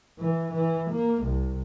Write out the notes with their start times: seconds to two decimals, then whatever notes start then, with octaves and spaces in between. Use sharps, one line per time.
0.19 E3
0.53 E3
0.91 A#3
1.23 C2